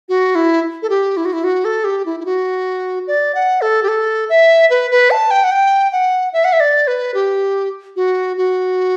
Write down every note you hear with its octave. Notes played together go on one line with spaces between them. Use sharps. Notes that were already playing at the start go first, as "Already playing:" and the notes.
F#4
E4
A4
G4
E4
F#4
E4
F#4
A4
G4
E4
E4
F#4
D5
F#5
A4
G4
A4
E5
B4
B4
A5
G5
F#5
G5
F#5
E5
F#5
E5
D5
B4
G4
F#4
F#4